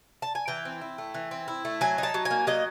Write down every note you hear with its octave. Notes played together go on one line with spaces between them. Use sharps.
A5
G#5
E3 G5
C4
E4
A3
E3
C4
E4
A3
F#3 G#5
D#4
A5
F#3
G#5
A#3
F#3 D#5